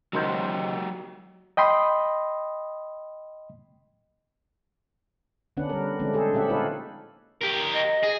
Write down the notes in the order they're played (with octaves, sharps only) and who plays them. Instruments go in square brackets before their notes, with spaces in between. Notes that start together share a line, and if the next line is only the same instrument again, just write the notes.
[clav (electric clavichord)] C#2 D#3 C5 [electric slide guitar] F#3 F#4 G4
[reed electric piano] D#5 G5 B5 C6 D#6
[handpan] D3 B3 C#4 D4 B4 F#5
G3 A#4
D3 F3 G#3 A3 C4 D4
G#4 A4 C5
A#2 C#4 G4 A4 E5 F#5
D#4 F4 G#4 A4 B4 C#5
[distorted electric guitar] G4 A#4
[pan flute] D#5
[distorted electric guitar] G#4